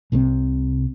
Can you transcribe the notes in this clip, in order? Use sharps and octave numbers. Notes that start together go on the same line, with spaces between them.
C2 C3 G3 C4